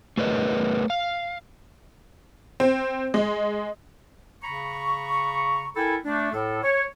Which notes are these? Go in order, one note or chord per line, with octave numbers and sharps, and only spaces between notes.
A3 G#4 A#4 B4 C#5 D#5
F5
C4
G#3
C#3 A#5 B5 C#6
E4 A4 A#4 G5 G#5 B5
A3 D4
A2 A4
C#5